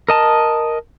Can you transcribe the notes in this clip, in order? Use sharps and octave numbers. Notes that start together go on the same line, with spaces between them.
A#4 D#5 A5